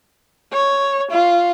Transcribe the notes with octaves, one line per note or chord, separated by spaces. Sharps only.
C#5
F4